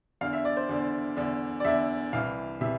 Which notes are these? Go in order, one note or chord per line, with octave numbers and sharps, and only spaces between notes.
E2 D3 F5
E5
D5
C5
E2 D3
E2 D3
D5
E2 D3 E5
C2 C3 E3 F5
C3 E3 E5